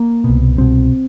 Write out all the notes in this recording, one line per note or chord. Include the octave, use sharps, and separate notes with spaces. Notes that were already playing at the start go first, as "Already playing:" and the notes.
Already playing: A#3
C2 B2
C2 B2 C4